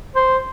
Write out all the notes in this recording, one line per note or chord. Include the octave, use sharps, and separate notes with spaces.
C5